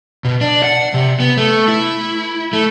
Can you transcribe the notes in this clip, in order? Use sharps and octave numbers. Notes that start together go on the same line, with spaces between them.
B2
D4
F#5
C3
B3
A3
E4
A3